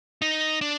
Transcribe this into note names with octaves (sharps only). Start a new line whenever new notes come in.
D#4
D4